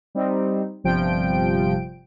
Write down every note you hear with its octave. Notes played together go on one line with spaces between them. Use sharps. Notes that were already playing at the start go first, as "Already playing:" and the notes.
G3 C4 D#4
G1 C3 F3 G3 G5 D7